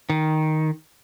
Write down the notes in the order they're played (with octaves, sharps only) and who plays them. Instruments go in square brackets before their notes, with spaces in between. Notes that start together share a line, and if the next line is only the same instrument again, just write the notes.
[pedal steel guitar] D#3